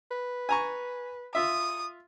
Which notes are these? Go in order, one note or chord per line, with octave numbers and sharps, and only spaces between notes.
B4
G#5 A#5 C#6
F4 E5 D#6